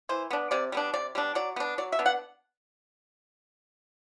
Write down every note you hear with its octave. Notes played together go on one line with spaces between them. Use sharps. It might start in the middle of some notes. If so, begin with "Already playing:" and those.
E3 C5
B3 D4
C3 D5
G3 B3 D4
C3 D5
G3 B3 D4
F#3 D5
B3 D4
F#3 D5
E5
B3 D4
F#5